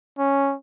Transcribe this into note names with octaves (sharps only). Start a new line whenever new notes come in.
C#4